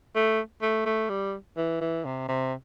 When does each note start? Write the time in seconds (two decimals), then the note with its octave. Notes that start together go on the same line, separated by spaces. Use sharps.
0.15 A3
0.62 A3
0.86 A3
1.09 G3
1.57 E3
1.81 E3
2.05 C3
2.28 C3